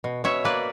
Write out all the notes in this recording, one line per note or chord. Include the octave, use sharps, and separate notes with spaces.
B2
B2 C#5 E5
A#3 B4 D5